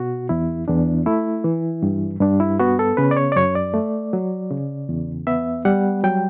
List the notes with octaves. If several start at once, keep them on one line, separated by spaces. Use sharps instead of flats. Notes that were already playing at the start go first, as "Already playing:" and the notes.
Already playing: B2 F#4
E2 E4
E2 D4
A3 E4
E3
G2
G2 D4
E4
B3 F#4
A4
C#3 B4
D5
C#5
D5
F#2 C#5
D5
A3
F#3
C#3
E2
B3 E5
G3 F#5
F#3 G5